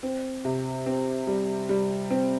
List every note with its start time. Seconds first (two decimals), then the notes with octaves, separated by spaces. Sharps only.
0.03 C4
0.45 C3
0.86 C4
1.27 G3
1.69 G3
2.10 C4